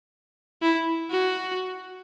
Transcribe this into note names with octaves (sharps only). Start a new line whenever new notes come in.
E4
F#4